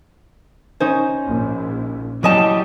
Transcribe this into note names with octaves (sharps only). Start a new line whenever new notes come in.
C#4 D#4 C5 G#5
A#1
F#3 G3 E4 D#5 A5 D#6